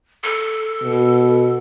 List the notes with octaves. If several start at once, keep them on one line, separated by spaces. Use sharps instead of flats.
A4
B2